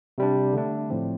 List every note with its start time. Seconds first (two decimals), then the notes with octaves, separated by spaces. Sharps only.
0.18 C3 G3 D4
0.53 D3 A3 D4
0.90 A2 F3 C4